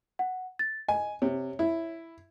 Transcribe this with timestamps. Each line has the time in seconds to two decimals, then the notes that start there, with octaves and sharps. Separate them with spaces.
0.19 F#5
0.59 A6
0.89 D#5 G#5
1.22 C3 C#5
1.59 E4